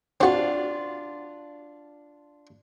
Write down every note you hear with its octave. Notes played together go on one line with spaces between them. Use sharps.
C4 D4 F4 F#4